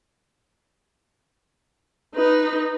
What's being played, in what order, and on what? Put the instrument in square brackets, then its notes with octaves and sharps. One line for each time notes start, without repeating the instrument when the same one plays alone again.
[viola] D#4 B4